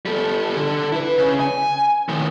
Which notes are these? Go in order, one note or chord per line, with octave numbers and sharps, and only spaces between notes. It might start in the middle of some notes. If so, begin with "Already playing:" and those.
G3 A4
D3
E4 B4
C#3
G#5
A2 D#3